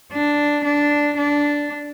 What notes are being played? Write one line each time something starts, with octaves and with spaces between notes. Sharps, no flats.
D4
D4
D4